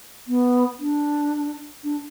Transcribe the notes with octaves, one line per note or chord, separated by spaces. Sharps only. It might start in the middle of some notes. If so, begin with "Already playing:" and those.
B3
D4
D4